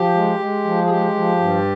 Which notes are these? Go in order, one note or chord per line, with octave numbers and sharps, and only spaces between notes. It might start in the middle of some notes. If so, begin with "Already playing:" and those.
Already playing: F3 G4
G#3
G#3
F3
G#4
G#3 G4
F3
G2